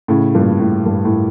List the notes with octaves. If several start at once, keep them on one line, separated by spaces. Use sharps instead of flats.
A2 C#3
G2 A#2
A2
G2
A2